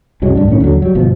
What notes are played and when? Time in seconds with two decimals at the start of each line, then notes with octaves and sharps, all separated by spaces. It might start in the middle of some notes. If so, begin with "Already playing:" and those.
0.22 C2 F#2 F#3 G#3
0.35 C#2 G2 D4
0.48 A2 D#3 C#4
0.60 D#2 D3 F#3
0.82 F#3 G3
0.95 G1 B2 F3